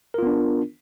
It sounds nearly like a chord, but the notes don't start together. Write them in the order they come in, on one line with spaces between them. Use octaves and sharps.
A#4 F4 B3 D4